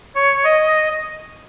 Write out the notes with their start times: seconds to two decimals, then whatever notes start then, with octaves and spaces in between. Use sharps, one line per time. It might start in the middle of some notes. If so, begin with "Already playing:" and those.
0.15 C#5
0.44 D#5